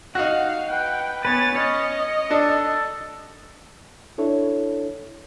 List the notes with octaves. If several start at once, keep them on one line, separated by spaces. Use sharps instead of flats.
D#4 F#4 F5 F#5
B4 G5
B3 B4 C#5 G#5 A6
C#4 C#5 D#5
D4 A4
D4 E4 A4 C#5